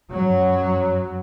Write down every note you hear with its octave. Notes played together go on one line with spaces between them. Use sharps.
F#2 F#3